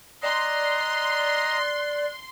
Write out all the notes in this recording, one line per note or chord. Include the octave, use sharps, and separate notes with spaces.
D5 D#5 A#5 C6 F#6